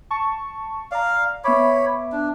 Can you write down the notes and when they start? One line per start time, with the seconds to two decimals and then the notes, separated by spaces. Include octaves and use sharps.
0.11 A5 C#6
0.92 D5 F5 A#5
1.44 B3 C#5 E5 B5 D6
2.12 D4